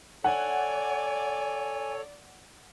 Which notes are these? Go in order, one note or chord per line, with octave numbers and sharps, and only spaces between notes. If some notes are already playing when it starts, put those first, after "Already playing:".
A4 C#5 D5 F#5 G#5